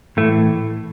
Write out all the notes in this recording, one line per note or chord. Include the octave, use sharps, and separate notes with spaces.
A2 E3 A3